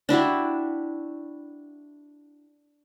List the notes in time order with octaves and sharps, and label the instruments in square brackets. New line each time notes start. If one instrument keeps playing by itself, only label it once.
[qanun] D4 E4 F#4 G4